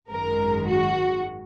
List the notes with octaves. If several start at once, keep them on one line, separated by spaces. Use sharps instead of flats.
G#1 F#2 D#3 G#3 A#4
F#4